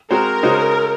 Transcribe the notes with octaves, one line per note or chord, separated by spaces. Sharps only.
G#3 C4 F#4 A#4 C5
C#3 G#3 D#4 F#4 C5